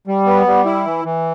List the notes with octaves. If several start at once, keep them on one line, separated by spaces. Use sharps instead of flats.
G3
B3
G3
E4
E3
E3